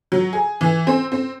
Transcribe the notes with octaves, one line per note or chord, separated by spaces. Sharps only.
F#3
G#4
E3
C4
C4